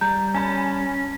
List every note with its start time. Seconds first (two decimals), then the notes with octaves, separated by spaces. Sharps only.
0.01 G3 A#5 G6
0.35 C#4 G#5 A5 B5